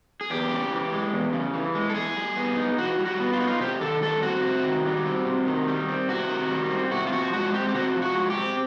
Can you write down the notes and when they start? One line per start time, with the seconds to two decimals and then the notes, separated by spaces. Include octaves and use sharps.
0.21 G#4
0.30 E2 G4
0.51 C#3
0.72 E3
0.92 G#3
1.13 E2
1.33 C#3
1.54 E3
1.75 G#3
1.90 A4
1.95 E3 G#4
2.16 G3
2.37 B3
2.57 D#4
2.78 E3 F#4
2.99 G3
3.06 F#4
3.20 B3
3.33 F4
3.40 D#4 F#4
3.48 F4
3.60 C3 G4
3.81 D#3 A4
4.02 G3 A4
4.23 C4 F#4
4.43 C3
4.65 D#3
4.85 G3
5.05 C4
5.26 C3
5.46 D#3
5.68 G3
5.89 C4
6.09 C3 F#4
6.29 D#3
6.51 G3
6.71 C4
6.91 C3 F#4
7.07 F4
7.12 F3 F#4
7.33 G#3 F#4
7.54 C4 G4
7.68 G4
7.75 C3 F#4
7.95 F3
8.02 F#4
8.15 G#3
8.30 G4
8.37 C4